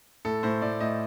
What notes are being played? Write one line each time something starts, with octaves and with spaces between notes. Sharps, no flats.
A2 A4
A2 C5
A2 D5
A2 D#5